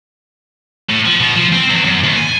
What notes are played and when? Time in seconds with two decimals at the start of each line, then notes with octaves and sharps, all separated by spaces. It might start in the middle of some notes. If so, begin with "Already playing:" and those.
0.89 A2
1.05 F3
1.20 B2
1.36 F3
1.53 C4
1.70 E2
1.85 F#2
2.04 D#2
2.16 G#5